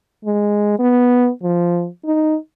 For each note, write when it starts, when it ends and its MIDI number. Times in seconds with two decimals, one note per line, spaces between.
0.25 0.75 56
0.79 1.29 59
1.43 1.88 53
2.05 2.36 63